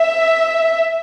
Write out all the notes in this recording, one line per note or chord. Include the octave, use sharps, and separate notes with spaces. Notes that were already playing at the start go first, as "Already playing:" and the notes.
Already playing: E5